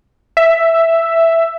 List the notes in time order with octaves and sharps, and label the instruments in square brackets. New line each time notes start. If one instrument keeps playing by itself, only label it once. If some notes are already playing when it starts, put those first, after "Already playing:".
[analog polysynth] E5